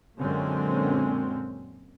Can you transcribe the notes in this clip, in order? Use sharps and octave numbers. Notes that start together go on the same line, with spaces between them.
F#2 A#2 D3 G#3 C4 C#4